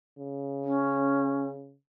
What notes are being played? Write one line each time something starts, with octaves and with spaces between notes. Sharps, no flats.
C#3
C#4